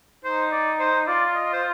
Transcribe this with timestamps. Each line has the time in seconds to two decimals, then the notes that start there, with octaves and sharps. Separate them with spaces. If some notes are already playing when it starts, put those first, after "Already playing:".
0.24 D#4 C5
0.52 D5
0.80 C5
1.07 F4 D5
1.35 D#5
1.53 C5